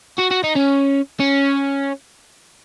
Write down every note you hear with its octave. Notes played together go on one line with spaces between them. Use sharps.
F#4
F#4
D#4
C#4
C#4